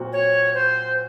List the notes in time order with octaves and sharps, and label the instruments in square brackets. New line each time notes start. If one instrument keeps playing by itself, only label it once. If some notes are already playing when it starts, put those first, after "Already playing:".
Already playing: [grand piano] A#2 F#3 C4 F#4
[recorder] C#5
C5